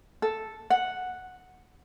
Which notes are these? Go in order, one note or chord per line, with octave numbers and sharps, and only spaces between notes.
A4
F#5